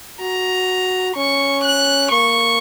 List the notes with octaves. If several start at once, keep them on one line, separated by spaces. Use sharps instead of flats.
F#4 A#5
C#4 C#6
F#6
A#3 C#6